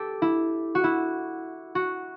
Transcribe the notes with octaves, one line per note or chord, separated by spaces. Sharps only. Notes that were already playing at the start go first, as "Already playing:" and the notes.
Already playing: G4 A4
E4
F#4
E4
F#4